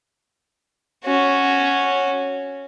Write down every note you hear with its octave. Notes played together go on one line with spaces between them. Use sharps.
C#4 F#4